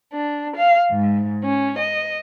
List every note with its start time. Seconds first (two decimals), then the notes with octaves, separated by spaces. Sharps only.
0.14 D4
0.56 F5
0.91 G#2
1.44 C#4
1.78 D#5